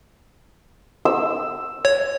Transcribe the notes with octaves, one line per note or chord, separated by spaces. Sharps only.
E6
C#5